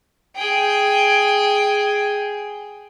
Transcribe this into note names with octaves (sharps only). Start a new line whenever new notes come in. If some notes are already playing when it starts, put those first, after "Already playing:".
G#4 G5